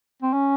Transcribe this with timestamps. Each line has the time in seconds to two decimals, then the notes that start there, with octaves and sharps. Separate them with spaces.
0.22 C4
0.33 C#4